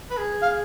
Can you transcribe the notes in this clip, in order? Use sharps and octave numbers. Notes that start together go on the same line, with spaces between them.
B4
G#4
F5